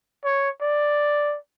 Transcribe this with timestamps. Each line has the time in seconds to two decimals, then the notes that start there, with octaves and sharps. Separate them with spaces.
0.24 C#5
0.61 D5